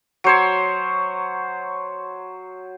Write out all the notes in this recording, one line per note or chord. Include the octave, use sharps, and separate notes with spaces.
F#3 C5 C#5